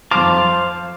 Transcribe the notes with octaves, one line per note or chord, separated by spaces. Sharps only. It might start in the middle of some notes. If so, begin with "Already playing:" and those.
F2 C5 F5 A5 D6